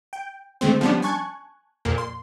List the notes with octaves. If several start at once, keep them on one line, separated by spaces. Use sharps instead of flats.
G5
D3 G#3 A3 C4
F3 G3 B3 C#4 D4
G#5 A5 C#6 F#6 G#6
F2 A#2 A#3
C6